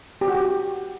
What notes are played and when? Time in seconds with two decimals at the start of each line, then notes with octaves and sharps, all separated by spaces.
0.21 G4
0.28 F#4
0.35 G4